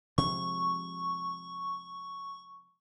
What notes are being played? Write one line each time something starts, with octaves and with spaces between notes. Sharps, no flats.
C3 F3 G#3 C#6